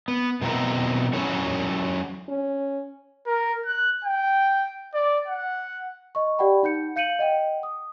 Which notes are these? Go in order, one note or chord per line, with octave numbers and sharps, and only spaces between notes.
B3
B2 F#3 C4 E4 A#4
F#3 C#4 E4 F#4 A4 C#5
C#4
A#4
F#6
G5
D5
F#5
D#5 C#6
G4 D5 F#5 G5 B5
D#4 F#5 G6 C#7
F5 G6 C#7 D#7 F#7
D#5 F#5 G5
D#6